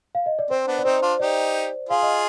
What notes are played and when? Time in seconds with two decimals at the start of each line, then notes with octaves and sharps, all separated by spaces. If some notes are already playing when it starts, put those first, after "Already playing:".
0.15 F5
0.26 D#5
0.39 D5
0.50 C4 C5
0.67 B3 D4
0.78 D5
0.85 C4 D#4 C5
1.02 D4 F4
1.19 D#4 G4 D5
1.89 F4 G#4 F5
2.02 D#5